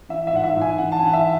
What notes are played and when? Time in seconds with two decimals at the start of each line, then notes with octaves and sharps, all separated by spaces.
0.09 E3 E5
0.27 E5
0.33 G#2 F#5
0.44 E5
0.56 G#2
0.62 G#5
0.78 E3 F#5
0.92 A5
0.99 G#5
1.02 E3 F#5
1.13 E5